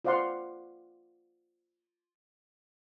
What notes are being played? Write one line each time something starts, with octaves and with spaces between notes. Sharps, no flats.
F4 C5 D5 F5 F#5 C6